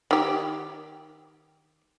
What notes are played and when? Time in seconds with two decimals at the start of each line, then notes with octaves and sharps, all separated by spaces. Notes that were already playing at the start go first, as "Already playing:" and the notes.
0.11 D#3 G4